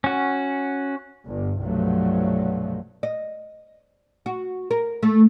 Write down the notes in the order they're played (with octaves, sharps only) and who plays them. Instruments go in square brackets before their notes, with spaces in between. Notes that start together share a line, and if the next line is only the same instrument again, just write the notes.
[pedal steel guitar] C#4 F#4
[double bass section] G1 G2
C2 G2 B2 F3 F#3 A3
[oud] D#5
F#4
A#4
A3